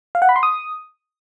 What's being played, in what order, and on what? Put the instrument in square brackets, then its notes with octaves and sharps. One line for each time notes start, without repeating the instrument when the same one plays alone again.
[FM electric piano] F5
F#5
B5
C6
D#6